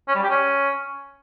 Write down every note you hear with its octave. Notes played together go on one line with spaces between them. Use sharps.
C#4
G3
G4
C#4